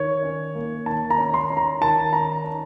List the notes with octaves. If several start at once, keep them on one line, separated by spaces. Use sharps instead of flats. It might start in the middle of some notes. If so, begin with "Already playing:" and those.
Already playing: D#3 C#5
C#4
A#3
D#3 A5
A#5
C#4
C6
C#4
A#5
D#3 A5
C#4 A#5
C#4